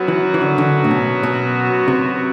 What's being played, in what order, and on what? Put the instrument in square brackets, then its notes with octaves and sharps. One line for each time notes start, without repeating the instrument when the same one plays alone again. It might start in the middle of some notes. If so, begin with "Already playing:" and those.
Already playing: [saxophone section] F#2 F#3 B3 F#4
[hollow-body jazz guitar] E3
E3
D3
D3
A2
B2
B2
C3